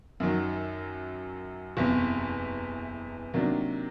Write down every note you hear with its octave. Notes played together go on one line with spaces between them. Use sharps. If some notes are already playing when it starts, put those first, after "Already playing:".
F#2 D#3 F#3
F#1 E2 C3
C3 D#3 F#3 A#3 D4